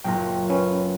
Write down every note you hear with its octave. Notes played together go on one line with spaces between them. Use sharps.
F#1 A#2 G5 A#5
C#4 B4